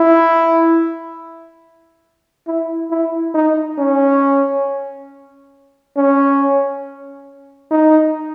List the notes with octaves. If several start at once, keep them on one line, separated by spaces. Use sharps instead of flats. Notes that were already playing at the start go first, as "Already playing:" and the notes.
Already playing: E4
E4
E4
D#4
C#4
C#4
D#4